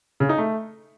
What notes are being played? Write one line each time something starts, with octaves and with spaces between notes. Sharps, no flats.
C#3
D#4
A3